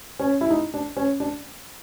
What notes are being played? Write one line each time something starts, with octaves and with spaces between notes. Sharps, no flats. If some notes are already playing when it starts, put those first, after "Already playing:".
C#4
E4
D#4
D4
C#4
D4